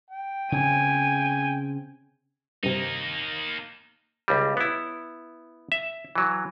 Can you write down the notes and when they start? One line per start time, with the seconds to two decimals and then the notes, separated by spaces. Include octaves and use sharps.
0.10 G5
0.52 C#3 C4 G#5
2.63 G2 C3 A#3 D#4
4.28 C#2 G3
4.57 B3 E4
5.72 E5
6.15 E3 F#3